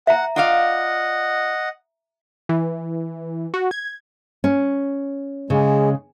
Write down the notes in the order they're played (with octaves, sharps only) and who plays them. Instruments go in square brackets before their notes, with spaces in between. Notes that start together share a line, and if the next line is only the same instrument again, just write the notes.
[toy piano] E5 A#5 [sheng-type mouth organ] F#5
[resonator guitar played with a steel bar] F4 D5 F5 [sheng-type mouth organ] D#5 F#5
[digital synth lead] E3
F#4
G#6
[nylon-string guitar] C#4
[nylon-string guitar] C#3 [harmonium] G#3